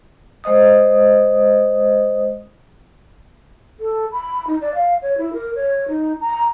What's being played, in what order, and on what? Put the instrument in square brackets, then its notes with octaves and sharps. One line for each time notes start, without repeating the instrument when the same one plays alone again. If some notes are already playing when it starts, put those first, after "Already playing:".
[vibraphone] G#3 C5 D#5 D#6
[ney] A4
B5
D#4
D5
F5
C#5
E4
A#4
C#5
D#4
A#5